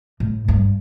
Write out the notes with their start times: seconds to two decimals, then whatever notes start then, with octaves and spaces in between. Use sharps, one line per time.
0.20 A2
0.48 G2